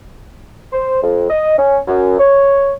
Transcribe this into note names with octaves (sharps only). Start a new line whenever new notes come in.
C5
F2
D#5
C#4
F#2
C#5